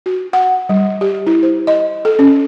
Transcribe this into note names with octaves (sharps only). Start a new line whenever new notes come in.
F#4
F#5
G3
G4
E4
C5
D#5
A4
C#4